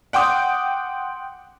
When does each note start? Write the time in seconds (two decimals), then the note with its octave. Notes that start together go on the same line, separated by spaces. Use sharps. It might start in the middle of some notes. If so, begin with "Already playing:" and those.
0.13 F#5 G5 C6 D6 D#6